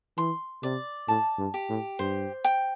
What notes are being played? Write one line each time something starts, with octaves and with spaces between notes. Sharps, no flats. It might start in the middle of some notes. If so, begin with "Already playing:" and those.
E3 C6
C3 D5
A2 A5
G2
G4
A2
G2 C5
G5